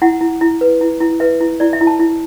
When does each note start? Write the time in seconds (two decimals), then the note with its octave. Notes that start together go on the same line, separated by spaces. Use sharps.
0.02 E4 F#5
0.21 E4
0.41 E4
0.61 B4
0.81 E4
1.00 E4
1.20 B4 E5
1.41 E4
1.60 E4 D5
1.73 E5
1.81 E4
1.87 A5
1.99 E4